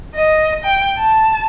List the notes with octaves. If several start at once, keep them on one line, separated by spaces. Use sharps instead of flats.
D#5
G5
A5